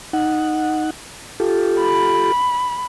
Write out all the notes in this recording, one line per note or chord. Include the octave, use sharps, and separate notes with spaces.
D#4 F#5
F4 G4 A4
B5